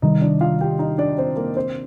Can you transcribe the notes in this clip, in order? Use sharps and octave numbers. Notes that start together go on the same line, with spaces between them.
C3 D#3 G3 D#4 D#5
D4 D5
F4 F5
G4 G5
D#4 D#5
D4 D5
C4 C5
A#3 A#4
C4 C5